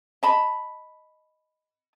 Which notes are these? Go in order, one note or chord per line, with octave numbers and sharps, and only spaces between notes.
D#5 A5 B5